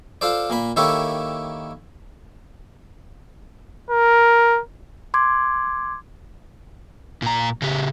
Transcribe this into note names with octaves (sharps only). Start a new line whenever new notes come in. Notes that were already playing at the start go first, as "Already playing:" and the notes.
F4 A4 C5 D5
A#2 A#3 B5
D#3 A#3 E4 G4 A4 C#5
A#4
C6 D6 G#6
A#2 A#5
C#3 G4